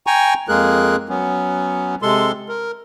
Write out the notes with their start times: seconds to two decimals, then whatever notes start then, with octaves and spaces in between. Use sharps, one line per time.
0.07 G5 G#5 A#5 C#6
0.49 F2 G#3 A#3 G#4 A#4 F#6
1.09 F#3 B3 C#4
2.02 C3 G#3 A4 C6
2.48 A#4